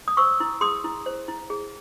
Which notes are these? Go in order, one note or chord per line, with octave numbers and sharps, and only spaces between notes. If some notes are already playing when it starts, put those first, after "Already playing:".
D#6
C5 C#6 E6
E4
G#4 C6 D#6
E4
C5
E4
G#4